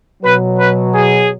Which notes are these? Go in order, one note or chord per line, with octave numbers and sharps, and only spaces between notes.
B2 F#3 B4
B4
G#4